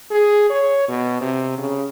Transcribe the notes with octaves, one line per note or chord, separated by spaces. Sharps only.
G#4
C#5
B2
C3
C#3